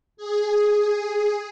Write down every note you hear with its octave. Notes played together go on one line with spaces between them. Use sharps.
G#4